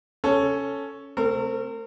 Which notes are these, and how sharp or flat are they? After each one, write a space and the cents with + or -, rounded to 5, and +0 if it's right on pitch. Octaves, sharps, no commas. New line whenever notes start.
C#4 +0 A4 +0
A3 +0 C4 +0 A#4 -35